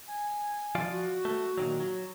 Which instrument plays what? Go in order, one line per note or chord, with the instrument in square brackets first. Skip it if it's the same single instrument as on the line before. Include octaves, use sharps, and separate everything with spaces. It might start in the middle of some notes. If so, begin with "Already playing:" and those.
[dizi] G#5
[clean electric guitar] F3 F4 D5
[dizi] F#4
[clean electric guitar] A3
A#2 D#3 F#3
F#3